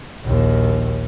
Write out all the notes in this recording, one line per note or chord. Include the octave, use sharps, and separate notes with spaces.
A#1 D#2